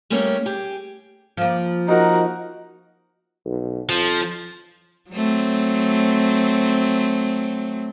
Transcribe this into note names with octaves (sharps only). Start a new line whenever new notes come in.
G3 A3 A#3 C#4
G4 G#4
F3 A#3
D#4 F#4 A#4 D#5
B1
F2 F3
F#3 A3 C4